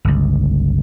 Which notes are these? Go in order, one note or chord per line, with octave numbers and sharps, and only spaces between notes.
G1 C#2